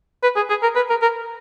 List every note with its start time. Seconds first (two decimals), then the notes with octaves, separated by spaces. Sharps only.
0.23 B4
0.36 G#4
0.49 G#4
0.62 A#4
0.75 B4
0.90 A#4
1.02 A#4